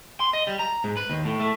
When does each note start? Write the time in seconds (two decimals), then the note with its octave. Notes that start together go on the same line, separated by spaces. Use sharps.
0.20 C6
0.33 D#5
0.47 G3
0.59 A#5
0.84 G#2
0.97 B4
1.10 D#2
1.25 A2
1.40 A3